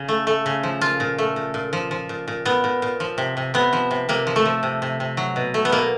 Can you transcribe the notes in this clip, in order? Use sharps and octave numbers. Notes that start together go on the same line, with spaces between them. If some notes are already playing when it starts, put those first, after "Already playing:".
Already playing: C#3
A3
A3
C#3
F3
A#2 F4
A#2
A3
A#2
A#2
F3
F3
A#2
A#2
A#2 B3
A#2
A#2
F3
C3
C3
C3 B3
F3
C3
C3 A#3
F3
A3
F3
C3
C3
C3
F#3
B2
A3
B3
B2 A#3